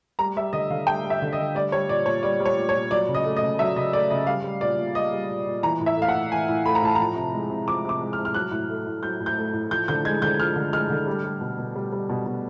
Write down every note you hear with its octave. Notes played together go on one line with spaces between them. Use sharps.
G3 A#5
G3 E5
D3 D#5
D3 F5
G3 G5
G3
E5
D3
D#5
D3
G3 D5
G3 C#5
A#2 D5
A#2 C#5
G3 D5
G3
C#5
A#2
C#5
A#2
F#3 D5
C#3
D#5
A3
D#5
C#3
F#3 E5
C#3 D#5
A3 D5
C#3 D#5
G3 F5
G3
A#2 D5
A#2
G3 D#5
G3
A#2
A#2
E3 A#5
A2
E5
A3
F5
F#5
A2
E3 G#5
A2
A3 B5
A#5
A2 A5
F3 A#5
C3
G#3
C3
F3 D6
C3 D6
G#3
F6
C3
F6
F#3 F#6
A2
A3
A2
F#3 G6
A2
G6
A3
A2
F3 G6
D3 G6
G#3 G#6
D3 G6
F3 F6
D3
G#3 F6
D3
G3
G3
B2
B2
G3
G3
B2
B2